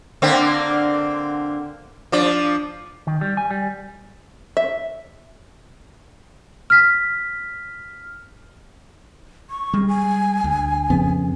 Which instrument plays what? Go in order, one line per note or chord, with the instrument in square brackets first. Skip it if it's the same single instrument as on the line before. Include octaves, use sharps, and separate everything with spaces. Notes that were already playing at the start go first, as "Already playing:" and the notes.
[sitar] D3 A#3 C4
F3 D4 D5
[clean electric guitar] D#3
G3
G#5
G3
[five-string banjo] E5
[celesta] F6 B6
[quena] C#6
[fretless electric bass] G3 G#3
[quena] G#5
[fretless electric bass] D2
[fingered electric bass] F2 C#3 [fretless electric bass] B3